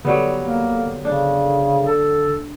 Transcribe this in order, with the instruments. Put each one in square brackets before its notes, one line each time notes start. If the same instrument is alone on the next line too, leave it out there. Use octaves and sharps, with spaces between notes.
[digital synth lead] D3 [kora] F#3 G3 B3
[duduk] A#3
[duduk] C#3 [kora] D4
[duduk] A4